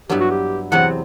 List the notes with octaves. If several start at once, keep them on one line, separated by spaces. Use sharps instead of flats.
G2 F#3 B3 E4 G4
F#4
G4
E2 C3 F#3 C4 F#5